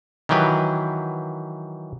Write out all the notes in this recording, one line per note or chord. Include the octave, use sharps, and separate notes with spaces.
D#3 E3 F#3 G4 B4